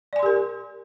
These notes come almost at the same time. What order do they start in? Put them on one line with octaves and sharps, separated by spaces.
D5 G#5 C6 G4 A#4